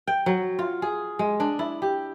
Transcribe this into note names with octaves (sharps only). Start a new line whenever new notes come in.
G5
F#3
F4
G#4
G#3
D4
E4
G4